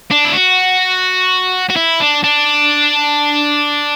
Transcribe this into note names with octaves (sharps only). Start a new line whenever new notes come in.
D4
E4
F#4
F#4
E4
D4
D4